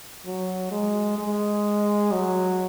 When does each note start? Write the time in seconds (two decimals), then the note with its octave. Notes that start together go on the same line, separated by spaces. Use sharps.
0.26 F#3
0.71 G#3
1.18 G#3
2.11 F#3